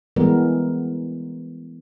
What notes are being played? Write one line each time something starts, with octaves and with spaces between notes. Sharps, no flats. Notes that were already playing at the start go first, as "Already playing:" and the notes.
E3 G3 G#3 B3 A#4